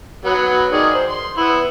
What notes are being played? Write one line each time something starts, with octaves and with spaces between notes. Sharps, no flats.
F#3 B3
D#3 G#4 D5
C5
C6
B3 E4